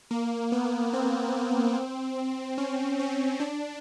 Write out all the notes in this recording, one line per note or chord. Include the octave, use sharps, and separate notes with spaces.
A#3
B3
C4
C#4
C#4
D4